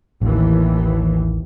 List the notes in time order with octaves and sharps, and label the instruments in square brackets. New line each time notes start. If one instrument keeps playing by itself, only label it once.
[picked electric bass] A1 [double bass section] D#2 E3